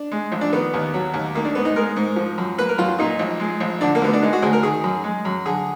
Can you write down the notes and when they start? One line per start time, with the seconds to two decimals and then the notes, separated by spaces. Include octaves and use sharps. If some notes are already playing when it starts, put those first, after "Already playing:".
Already playing: D4
0.12 G#3
0.32 A#1
0.41 D4
0.53 D#3 B3
0.74 D#2
0.94 F#3
1.14 D#2
1.35 D#3 A#3
1.45 D4
1.55 G#2 B3
1.65 D#4
1.76 G#3 A#4
1.96 G#2
2.16 F3
2.38 F#2
2.58 A#3 B4
2.69 A#4
2.78 F#2 F4
2.88 F4
2.99 A#2 D#4
3.19 A#1
3.40 G#3
3.60 A#1
3.81 D3 D4
3.95 A#3
4.02 D2 B3
4.13 D4
4.23 G#3 D#4
4.33 F#4
4.42 D2 G#4
4.53 A#4
4.63 D#3 G#4
4.84 F#2
5.04 G#3
5.25 F#2
5.46 D3 G#4